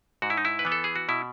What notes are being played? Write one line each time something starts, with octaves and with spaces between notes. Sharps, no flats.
G#2 F#4
E4
D#4
E4
B4
E3 B3
A4
G#4
F#4
B2 E4